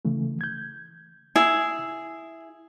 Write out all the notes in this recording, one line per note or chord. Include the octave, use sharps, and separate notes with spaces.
C#3 E3 A3
G6 G#6
E4 G#4